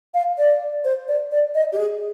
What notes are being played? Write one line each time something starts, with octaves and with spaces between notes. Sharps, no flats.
F5
D5
C5
D5
D5
D#5
G4
G#4